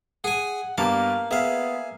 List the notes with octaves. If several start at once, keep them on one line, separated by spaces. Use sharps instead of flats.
G#4 F#5 G#5
G2 A#3 B3 G4 F5 A5
B3 G#4 E5 F5